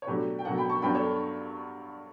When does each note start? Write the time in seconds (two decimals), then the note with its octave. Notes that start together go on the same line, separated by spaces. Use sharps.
0.02 C#5
0.07 B2 F#3 A3 D4 G4 B4
0.39 G5
0.45 B2 F#3 A3 D4 F#5 A5
0.58 G5 B5
0.69 A5 C#6
0.82 G2 F#3 B3 D4 G5 B5
0.95 A4 C#5